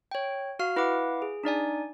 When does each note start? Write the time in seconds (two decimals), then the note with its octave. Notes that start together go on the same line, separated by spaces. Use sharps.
0.11 C#5 G5
0.59 F#4 F5 F6
0.76 E4 B4 F5 F#5 D6
1.22 G#4
1.44 D4 D#4 D5 G#5